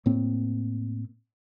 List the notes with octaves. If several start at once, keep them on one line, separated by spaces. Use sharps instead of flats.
A2 A#3 C4